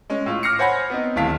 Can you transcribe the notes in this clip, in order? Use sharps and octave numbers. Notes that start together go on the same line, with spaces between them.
G#3 C#4
A2 F4
D6 F6 A#6 C7 C#7
C5 C#5 F#5 G#5 B5 A#6
B3 C4 D#4
D1 D#2 E4 F5 A5 B6